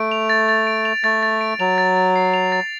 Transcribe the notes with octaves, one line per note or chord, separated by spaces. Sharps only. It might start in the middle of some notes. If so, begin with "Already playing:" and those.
Already playing: A3 D7
F7
A6
A6
D7
F7
A3 A6
A6
D7
F#3 F7
A6
A6
C7
F7
A6